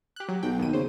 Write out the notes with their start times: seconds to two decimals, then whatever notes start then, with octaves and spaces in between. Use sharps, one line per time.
0.16 G4 F#6
0.29 F#3
0.43 B1 G5
0.59 D#2 D#7
0.73 C#3 C5